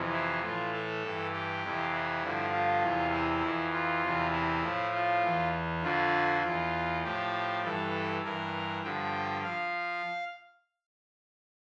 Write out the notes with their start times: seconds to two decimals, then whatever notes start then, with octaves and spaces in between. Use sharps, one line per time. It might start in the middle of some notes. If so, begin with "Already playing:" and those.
Already playing: F2 C3 E3
0.12 E4
0.42 A2 E3 F4
0.73 A4
1.03 G2 E3
1.33 G4
1.63 F2 C3 E3
1.92 E4
2.23 G2 D3 F3
2.52 F4
2.83 E2 C3 E3
3.12 E4
3.43 F2 E3
3.72 F4
4.03 E2 C3 E3
4.33 E4
4.64 A2 F3
4.94 F4
5.23 E2 E3
5.83 F2 D3 F3 F4
6.43 E2 E3 F4
7.04 A2 F3 G4
7.63 G2 E3 A4
8.24 G2 E3 A#4
8.84 G2 D3 F3 G5
9.43 F3 F5